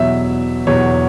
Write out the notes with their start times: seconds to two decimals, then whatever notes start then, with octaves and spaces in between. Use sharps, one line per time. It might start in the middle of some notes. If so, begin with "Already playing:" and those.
Already playing: E2 B2 F#3 E5
0.67 E2 B2 F#3 C#5